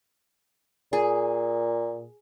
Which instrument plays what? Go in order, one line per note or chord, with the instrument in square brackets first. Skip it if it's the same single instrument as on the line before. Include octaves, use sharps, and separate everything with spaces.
[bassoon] A#2 [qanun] G#4